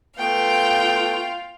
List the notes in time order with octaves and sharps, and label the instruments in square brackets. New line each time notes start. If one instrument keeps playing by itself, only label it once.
[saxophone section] A3 B3 [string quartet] F4 F5 [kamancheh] G5